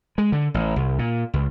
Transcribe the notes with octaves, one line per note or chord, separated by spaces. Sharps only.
G#3
D3
A1
C2
A#2
C#2